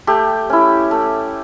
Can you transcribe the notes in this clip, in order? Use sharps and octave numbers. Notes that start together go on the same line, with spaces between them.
A3 G4
C#4 E4
A3